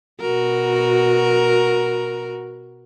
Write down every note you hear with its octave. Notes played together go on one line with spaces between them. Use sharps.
B2 F#4 A#4